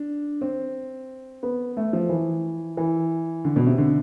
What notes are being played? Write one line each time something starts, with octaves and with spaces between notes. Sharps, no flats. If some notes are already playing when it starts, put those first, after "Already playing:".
Already playing: D4
C4
B3
A3
F3
E3
E3
D3
B2
C3
D3